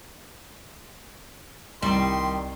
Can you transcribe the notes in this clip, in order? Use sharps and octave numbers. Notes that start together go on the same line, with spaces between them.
C2 D#3 G3 C6